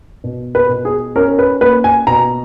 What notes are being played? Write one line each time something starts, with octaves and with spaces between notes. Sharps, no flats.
B2
B4
B2
G#4
C#4 A#4
B4
A#3 B4
G#5
B2 A#5